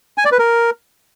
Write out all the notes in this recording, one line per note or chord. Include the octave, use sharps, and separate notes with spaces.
G#5
D5
B4
A#4